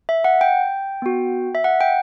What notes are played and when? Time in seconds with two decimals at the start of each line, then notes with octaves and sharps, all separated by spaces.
0.09 E5
0.24 F#5
0.41 G5
1.02 B3 F#4
1.55 E5
1.64 F#5
1.81 G5